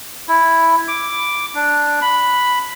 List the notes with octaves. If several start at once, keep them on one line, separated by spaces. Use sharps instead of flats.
E4
D6
D4
B5